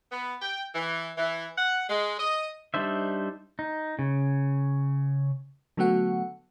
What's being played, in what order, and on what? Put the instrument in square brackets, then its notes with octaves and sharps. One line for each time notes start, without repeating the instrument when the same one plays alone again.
[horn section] B3
G5
E3
E3
F#5
G#3
D#5
[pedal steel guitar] G3 D4 D#4 C5 E5
D#4
C#3
[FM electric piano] D3 F#3 A3 B3 F#4 F#5